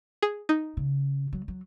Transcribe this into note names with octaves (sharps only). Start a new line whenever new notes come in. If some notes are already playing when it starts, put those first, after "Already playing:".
G#4
D#4
C#3
F#3
F#3